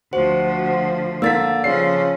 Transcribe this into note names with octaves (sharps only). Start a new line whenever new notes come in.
D2 F3 F#4 C5
D3 A#3 E6 A6 B6
C#3 F3 C#4 C7